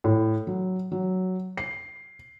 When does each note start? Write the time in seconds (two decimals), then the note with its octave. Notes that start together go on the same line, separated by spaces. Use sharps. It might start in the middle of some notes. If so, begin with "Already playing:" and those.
0.04 A2
0.47 F#3
0.92 F#3
1.57 C7